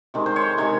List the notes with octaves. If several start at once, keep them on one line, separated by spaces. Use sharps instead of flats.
C3 D#3 G#3
C5
C#5
C3 D#3 G#3 C#5